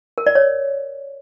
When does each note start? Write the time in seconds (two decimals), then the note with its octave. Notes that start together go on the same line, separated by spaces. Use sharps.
0.18 A#4
0.26 D5
0.35 C#5